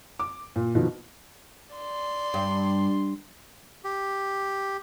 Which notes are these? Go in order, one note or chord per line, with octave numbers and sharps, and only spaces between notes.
D6
A#2
B2 D#3 F3 F#4
D5 C6
G2
G4